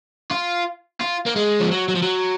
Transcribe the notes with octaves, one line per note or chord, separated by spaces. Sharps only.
F4
F4
A#3
G#3
F3
F#3
F#3
F3
F#3